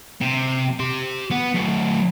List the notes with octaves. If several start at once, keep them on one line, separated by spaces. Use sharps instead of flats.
C3
G4 C6
B3
F#3 A3